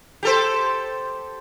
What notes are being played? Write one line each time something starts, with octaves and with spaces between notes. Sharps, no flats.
G4 A4 C5